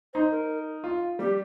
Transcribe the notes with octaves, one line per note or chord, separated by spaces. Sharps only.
D#4 C5
A#4
F4
G3 G4